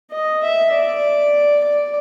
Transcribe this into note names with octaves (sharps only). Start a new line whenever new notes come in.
D#5
E5
D5
D5